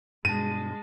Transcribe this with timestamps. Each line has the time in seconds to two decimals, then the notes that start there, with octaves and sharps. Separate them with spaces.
0.25 G2 B2 G#3 A5 A6 A#6 D#7